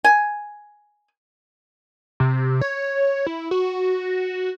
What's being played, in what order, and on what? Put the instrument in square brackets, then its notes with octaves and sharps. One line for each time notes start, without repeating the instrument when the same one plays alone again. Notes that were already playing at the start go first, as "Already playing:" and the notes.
[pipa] G#5
[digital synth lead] C3
C#5
E4
F#4